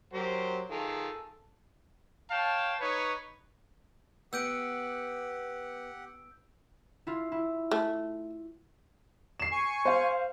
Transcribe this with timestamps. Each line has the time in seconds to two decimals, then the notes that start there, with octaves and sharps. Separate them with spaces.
0.13 F#3 G4 A#4 C5
0.71 D#3 F4 G#4 A4
2.31 C#5 F5 G5 A5
2.80 D#4 B4 C#5
4.33 B3 G4 F#5 E6 G6 D7
7.07 E4 F4
7.32 E4
7.71 A3
9.40 C7 E7
9.52 G#5 C#6
9.85 C5 F5